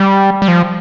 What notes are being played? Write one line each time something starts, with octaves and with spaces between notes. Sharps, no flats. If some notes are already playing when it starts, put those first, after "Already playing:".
Already playing: G3
G3
F3